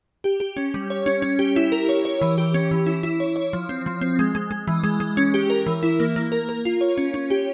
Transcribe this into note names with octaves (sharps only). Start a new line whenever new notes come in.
G4
G4
C#4
G3
C#5
C#4
C#4
G4
E4
A#4
C#5
C#5
E3
G4
C#4
E3
E4
E4
C#5
C#5
F3
C4
F3
C4
G#3
G#3
G#3
E3
G#3
G#3
C#4
G4
A#4
E3
E4
A#3
A#3
A#4
A#4
F4
C#5
C#4
C#4
G4